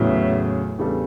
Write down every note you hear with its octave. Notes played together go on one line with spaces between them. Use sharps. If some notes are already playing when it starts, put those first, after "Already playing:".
Already playing: E2 A2 C#3 F#3
E2 C#3 G3 D4 A4